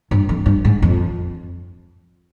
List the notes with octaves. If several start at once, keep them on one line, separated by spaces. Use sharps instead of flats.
G2
F2
G2
G#2
F2